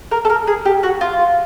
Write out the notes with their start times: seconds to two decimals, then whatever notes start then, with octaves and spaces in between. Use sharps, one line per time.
0.11 A#4
0.25 A4
0.30 A#4
0.47 G#4
0.65 G4
0.83 F#4
1.01 F4